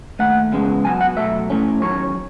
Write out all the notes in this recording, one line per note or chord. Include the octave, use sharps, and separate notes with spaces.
D#2 D#3 A3 F#5
E2 C#3 G#3 B3
B1 B2 F#3 B3 G#5
F#5
B2 F#3 A3 E5
A2 E3 A3 C#4
E2 D#3 F#3 C#4 C#5